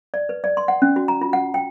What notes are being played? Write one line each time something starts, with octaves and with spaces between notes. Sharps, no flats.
D5
B4
D5
C6
F#5
C#4
F#4
A#5
F4
F#5
G5